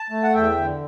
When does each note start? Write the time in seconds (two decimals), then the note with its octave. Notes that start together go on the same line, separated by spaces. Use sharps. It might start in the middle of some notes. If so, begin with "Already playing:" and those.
Already playing: A5
0.10 A3
0.23 F#5
0.34 E2 E5 G5
0.58 D3